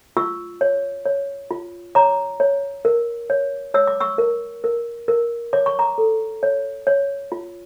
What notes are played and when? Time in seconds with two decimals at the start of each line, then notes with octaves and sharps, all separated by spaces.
0.17 F4 C#6 E6
0.61 C#5
1.06 C#5
1.51 F4
1.95 C#5 A#5 D6
2.40 C#5
2.85 A#4
3.30 C#5
3.74 C#5 E6
3.87 D6
4.00 C#6 E6
4.18 A#4
4.64 A#4
5.08 A#4
5.53 C#5 D6
5.66 C#6
5.79 A#5 D6
5.98 A4
6.43 C#5
6.87 C#5
7.32 F4